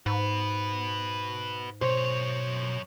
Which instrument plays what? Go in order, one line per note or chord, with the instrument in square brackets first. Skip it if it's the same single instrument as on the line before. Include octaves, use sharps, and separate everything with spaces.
[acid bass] G#2 [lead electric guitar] F#4 B4
[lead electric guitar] F#2 C#5 [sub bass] B2 [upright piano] C5